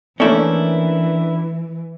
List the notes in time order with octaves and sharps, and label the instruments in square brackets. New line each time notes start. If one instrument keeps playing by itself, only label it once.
[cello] E3 [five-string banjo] A3 A#3 [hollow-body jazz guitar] C#4 D4 E4